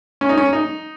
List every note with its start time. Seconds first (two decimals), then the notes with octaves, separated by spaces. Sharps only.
0.21 C#4
0.29 D#4
0.38 C#4
0.53 D#4